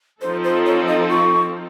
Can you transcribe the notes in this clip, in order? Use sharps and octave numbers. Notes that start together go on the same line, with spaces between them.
F3 C4 D#4 A4 C5
C5
C#5
D#5
C#6